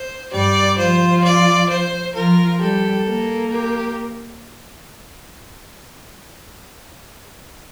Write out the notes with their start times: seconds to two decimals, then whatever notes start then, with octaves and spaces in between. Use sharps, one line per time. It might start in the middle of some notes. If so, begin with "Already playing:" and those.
Already playing: C5
0.32 G2 G3 D5
0.78 F3 F4 C5
1.24 D5
1.69 C5
2.15 F3 F4 A#4
2.60 G3 G4 A4
3.06 A#3 A#4
3.51 G4